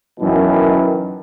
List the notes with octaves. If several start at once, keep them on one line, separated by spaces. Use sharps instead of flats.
F#2 B2 D#3 E3